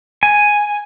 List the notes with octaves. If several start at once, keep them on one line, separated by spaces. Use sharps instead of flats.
G#5